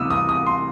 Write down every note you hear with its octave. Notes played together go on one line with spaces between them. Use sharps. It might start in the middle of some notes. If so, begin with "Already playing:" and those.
Already playing: C3 E3 G3 B3 D#6 E6
D#6
D#6
C6